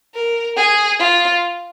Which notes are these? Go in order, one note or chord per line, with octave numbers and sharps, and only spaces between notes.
A#4
G#4
F4